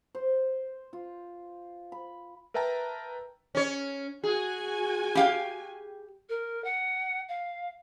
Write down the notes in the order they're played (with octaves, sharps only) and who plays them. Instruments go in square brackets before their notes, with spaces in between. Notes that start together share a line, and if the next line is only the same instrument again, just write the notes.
[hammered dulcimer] C5
F4
B5
[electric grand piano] A#4 B4 E5 G5 A5 A#5
[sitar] C#4 C#5
[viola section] F#4 G#5 [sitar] G#4
[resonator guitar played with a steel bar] G4 F5 G5
[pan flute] A#4
F#5
F5